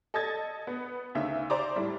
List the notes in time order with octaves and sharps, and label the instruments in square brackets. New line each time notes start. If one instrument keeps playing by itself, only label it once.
[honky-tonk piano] A4 D#5 A5 G#6 A6
B3
D2 C#3 D#4 E5
C5 D5 A#5 C6 D6
A2 G3